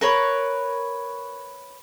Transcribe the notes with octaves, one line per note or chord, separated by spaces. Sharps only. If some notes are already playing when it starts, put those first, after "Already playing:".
A#4 B4 C#5